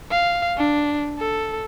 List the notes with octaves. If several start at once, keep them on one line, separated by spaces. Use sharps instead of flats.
F5
D4
A4